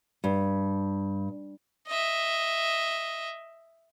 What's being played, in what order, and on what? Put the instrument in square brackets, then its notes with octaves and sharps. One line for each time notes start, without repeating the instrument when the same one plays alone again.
[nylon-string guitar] G2
[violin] D#5 E5